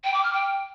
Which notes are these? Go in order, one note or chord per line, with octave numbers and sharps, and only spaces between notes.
G5
D6
F6
G5